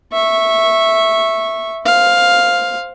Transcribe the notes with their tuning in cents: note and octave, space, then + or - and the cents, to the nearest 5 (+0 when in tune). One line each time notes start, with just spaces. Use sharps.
E5 +0 C#6 -15
C5 +0 F5 +5